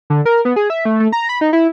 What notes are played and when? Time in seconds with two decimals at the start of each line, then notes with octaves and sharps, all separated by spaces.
0.10 D3
0.26 A#4
0.45 B3
0.56 G#4
0.70 E5
0.85 A3
1.00 A3
1.12 A#5
1.29 B5
1.41 D#4
1.53 E4